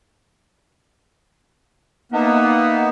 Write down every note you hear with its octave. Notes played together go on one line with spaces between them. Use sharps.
A#3 B3 D#4 E5 F#5